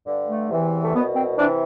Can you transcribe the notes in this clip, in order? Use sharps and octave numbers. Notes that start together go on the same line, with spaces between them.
G2 D3
A3
E2 C3 E3
A3
C2 B2 B3
C4
C3 E3 D4